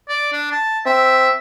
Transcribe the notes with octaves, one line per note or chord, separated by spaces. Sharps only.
D5
D4
A5
C4 E5